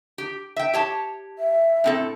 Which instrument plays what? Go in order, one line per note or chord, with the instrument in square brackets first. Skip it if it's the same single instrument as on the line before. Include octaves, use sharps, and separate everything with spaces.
[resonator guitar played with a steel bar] G4
E5 G5
G4 C#5 A5
[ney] E5
[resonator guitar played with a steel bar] A2 C4 A4